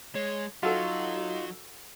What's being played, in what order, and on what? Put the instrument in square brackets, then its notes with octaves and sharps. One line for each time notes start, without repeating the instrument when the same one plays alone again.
[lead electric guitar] G#3 [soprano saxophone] C#5
[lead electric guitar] F#3 [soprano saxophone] D#4 [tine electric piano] F4 [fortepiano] F#4 A4